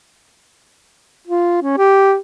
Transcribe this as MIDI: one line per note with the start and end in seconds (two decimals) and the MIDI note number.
1.27 1.61 65
1.62 1.74 61
1.77 2.16 67